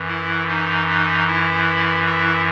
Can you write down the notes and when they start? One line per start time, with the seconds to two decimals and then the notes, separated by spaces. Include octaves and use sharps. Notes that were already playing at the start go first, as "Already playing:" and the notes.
Already playing: F#2 E3
0.08 E4
0.48 D#4
0.88 D#4
1.27 E4
2.06 E4